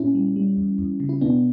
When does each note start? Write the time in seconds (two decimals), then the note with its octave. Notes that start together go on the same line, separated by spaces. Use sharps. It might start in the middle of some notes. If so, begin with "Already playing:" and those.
Already playing: A#2 C#4 E4
0.15 G3
0.36 G3
0.57 E2
0.78 E2
1.00 C#3
1.09 E4
1.21 B2 B3 D4